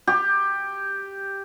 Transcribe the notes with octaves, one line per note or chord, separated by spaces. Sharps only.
G4